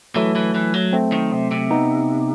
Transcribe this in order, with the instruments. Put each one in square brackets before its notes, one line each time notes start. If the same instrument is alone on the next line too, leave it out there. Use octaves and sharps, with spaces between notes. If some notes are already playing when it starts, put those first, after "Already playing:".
[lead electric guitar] E3 [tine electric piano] F#3 A3
[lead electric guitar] E3
E3
F#3
[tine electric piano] A3 C4
[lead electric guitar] D#3
C3
C3
[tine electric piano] B3 D#4